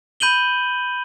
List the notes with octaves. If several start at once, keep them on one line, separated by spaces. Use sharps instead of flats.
B5 G6 D#7 F#7 G7